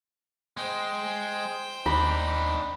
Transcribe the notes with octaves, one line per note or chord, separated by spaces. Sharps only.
G#3 C5 G5
D#2 D4 D#4 B5